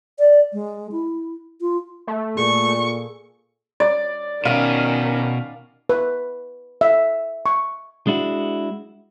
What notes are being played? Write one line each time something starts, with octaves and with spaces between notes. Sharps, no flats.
D5
G#3
E4
F4
A3
A#2 G#4 A4 C#6
D5
B2 D#3 C#4 F5
B4
E5
C#6
G#3 D4 E4 F#4